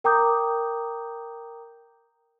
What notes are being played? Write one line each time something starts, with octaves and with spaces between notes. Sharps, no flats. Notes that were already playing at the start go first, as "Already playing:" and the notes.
A#4 G5 A#5 D6 D#6 G6